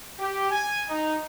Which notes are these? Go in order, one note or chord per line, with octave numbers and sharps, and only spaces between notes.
G4
G#5
D#4